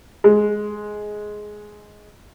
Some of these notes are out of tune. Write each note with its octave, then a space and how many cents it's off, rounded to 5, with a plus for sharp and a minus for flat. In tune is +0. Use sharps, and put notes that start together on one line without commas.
G#3 +5